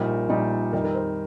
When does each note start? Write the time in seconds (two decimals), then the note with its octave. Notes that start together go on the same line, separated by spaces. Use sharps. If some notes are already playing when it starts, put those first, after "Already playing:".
Already playing: A#1 A#2 G3 D#4 A#4
0.29 A#1 A#2 G3 D#4
0.72 F2 D#3 G3 D#4 A#4
0.84 A#4
0.94 C5